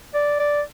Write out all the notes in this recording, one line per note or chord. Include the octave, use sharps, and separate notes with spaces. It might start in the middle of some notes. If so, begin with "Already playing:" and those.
D5
D5